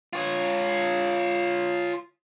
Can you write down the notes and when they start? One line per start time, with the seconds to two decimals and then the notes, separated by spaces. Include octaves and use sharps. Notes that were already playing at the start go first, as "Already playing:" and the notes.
0.13 F4 C#5